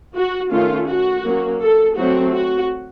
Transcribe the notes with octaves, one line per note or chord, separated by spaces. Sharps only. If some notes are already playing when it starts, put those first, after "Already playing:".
F#4
D#3 A3 C#4 F4
F#4
F#3 A#3 C#4
A4
F#3 A3 C4 F#4
F#4